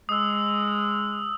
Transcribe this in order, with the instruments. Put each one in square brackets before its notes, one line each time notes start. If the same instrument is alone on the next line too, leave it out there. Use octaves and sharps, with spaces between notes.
[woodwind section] G#3 [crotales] D#6 E6